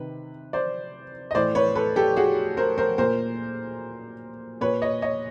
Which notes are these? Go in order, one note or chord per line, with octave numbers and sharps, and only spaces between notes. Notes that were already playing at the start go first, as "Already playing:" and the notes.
Already playing: C3 D#3 B4
C5 D5
D#5
A2 E3 C5 D5
B4 C#5
A4 B4
G4 A4
F#4 G#4
A#4 C5
A#4 C5
A#2 A#4 C5
A#2 B4 C#5
C#5 D#5
C#5 D#5